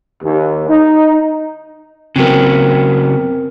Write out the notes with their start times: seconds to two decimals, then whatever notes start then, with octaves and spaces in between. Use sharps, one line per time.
0.23 D#2
0.69 D#4
2.16 C#3 F#3 B3 C4 A#4